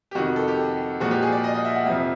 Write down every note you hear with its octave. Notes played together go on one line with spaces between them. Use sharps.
G4
F2 C3 D#3 F#4
A4
G4
A#2 F3 G#3 F#4
G4
G#4
D5
D#5
D#5
E5
F#5
F2 C3 F3 E5